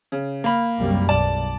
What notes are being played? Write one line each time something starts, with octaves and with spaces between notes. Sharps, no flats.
C#3
A#3 B5
C2 F#2 G3
B1 D5 A5